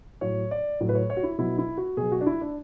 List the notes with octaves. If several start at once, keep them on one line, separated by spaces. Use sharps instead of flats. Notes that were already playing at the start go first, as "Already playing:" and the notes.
A2 F#3 C#5
D5
A2 F#3
B4
C#5
C#5
F#4
E4
B2 F#3 E4
E4
F#4
B2 F#3 G#4
F#4
D4
E4
D4